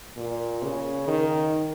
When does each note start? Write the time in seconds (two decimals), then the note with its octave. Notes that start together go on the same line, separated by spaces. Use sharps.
0.17 A#2
0.62 C#3
1.08 D#3